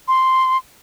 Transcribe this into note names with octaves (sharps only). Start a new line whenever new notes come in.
C6